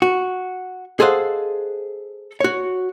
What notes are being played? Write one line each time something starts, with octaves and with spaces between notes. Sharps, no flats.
F#4
G#4 A4 C5 D#5 F5 F#5
F#4 C#5